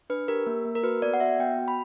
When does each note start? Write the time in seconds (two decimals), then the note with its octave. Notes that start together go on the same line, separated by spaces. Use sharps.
0.10 D4 B4
0.28 G4 A#4
0.47 A#3
0.65 A#3
0.75 A#4
0.83 F#4 B4
1.02 B3 D5
1.14 F#5
1.20 F#4 E5
1.39 B3 G5
1.58 F#4
1.68 B5